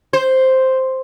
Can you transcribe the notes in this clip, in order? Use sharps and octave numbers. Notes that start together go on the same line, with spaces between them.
C5